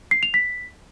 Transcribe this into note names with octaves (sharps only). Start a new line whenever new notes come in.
C7
F7
B6